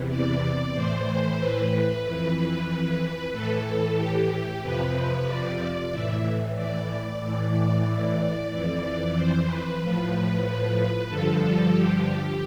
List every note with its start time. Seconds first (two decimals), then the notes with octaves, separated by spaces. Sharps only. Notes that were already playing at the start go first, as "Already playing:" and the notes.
Already playing: E2 C3 E3
0.09 D5
0.74 A2 E3 C5
1.38 B4
2.03 F2 E3
3.32 A2 E3 A4
3.97 G4
4.61 F2 C3 F3 B4
5.26 D5
5.90 A2 E3 E5
6.56 D5
7.20 A2 E3
8.49 F2 E3 D5
9.15 C5
9.47 B4
9.78 A2 F3
10.43 B4
11.08 G2 D3 F3 A4
11.40 A4
11.73 G4